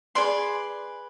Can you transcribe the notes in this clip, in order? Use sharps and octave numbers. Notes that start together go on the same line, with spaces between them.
G#4 B4 D5 C6